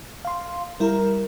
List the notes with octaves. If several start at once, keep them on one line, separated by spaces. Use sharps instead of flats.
F5 C6
G3 E4 A#4